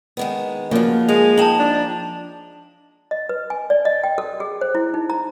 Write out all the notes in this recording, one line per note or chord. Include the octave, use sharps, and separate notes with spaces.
D#3 G#3 B3
C#3 F3 F#3 A#3
G#3 G#4 F7
D#4 G5 A5 E7 F#7
D4
D#5
B4
G#5
D5
D#5
G5
A4
G#4
C5
E4
D#4
A#5